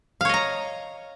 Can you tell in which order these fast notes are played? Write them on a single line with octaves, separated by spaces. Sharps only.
F5 C#5 D#5 A#5